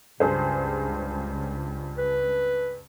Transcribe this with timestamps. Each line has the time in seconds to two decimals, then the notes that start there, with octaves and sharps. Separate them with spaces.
0.20 C#2 G2 G#4 C5
1.98 B4